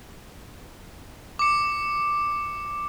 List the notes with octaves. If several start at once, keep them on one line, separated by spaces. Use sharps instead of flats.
D6 C#7